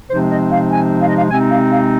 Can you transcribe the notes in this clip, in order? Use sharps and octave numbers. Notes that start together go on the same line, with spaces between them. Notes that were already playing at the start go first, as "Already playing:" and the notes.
C3 F3 G#3 C4 D#4 C5
D#5
F5
G#5
F5
D#5
F5
C3 G#3 C4 D#4 G#5
F5
F5